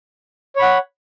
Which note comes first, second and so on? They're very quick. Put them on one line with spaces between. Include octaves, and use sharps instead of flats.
C#5 B5 F#5